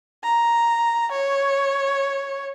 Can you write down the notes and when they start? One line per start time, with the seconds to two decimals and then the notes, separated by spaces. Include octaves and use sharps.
0.24 A#5
1.11 C#5